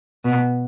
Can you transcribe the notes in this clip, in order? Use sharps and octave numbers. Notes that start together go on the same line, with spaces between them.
B2